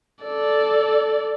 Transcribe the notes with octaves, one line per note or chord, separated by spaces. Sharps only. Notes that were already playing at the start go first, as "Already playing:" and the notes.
A4 D5